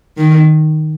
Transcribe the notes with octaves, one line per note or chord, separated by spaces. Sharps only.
D#3